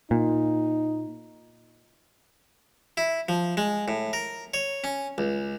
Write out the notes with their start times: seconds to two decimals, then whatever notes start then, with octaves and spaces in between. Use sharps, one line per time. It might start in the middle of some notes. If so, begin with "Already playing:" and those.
0.11 A#2 D#4
2.97 E4
3.29 F3
3.57 G#3
3.88 A2
4.13 A#4
4.54 C#5
4.84 C#4
5.18 C#2